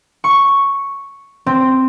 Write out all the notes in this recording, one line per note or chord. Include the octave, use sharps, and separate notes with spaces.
C#6
C4